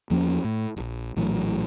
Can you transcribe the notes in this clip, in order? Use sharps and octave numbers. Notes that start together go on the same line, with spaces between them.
E2 F3 A#3 C#4
A2
D1 A#1
A#1 A2 E3 F#3